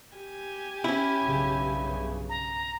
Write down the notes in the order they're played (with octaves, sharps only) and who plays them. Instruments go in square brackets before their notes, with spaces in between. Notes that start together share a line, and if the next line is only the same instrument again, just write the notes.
[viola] G4 G#5
[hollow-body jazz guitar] C#4 E4
[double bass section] B1 G2 C#3
[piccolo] A#5